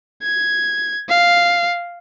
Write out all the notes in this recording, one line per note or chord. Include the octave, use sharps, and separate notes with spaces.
G#6
F5